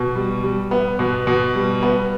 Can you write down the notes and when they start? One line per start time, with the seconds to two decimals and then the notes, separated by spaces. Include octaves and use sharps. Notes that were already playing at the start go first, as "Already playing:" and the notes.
Already playing: B2
0.15 G3
0.43 G3
0.71 B3
0.99 B2
1.27 B2
1.55 G3
1.83 B3